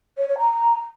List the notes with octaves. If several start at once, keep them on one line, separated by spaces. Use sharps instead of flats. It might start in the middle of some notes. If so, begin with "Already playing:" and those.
C#5
C#5
A#5